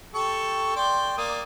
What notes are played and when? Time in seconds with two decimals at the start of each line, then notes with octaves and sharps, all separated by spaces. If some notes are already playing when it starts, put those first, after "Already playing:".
0.14 G4 A4 C#6
0.76 D5 G5 C6
1.18 A#3 D5 D#6